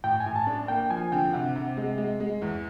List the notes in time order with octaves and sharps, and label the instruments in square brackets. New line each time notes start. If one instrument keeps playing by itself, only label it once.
[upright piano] A2 [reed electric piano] G5
[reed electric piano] G#5
[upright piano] A2
[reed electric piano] A5
[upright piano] D4
[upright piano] A#3 [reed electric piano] G5
[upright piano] F3 [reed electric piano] G#5
[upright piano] D3 [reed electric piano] G5
[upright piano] C3 [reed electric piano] F#5
[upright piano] C3
G#3
G#3
G#3
E2